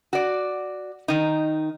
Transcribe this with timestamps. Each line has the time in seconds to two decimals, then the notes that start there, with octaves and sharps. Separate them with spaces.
0.13 F#4 D5
1.08 D#3 D#4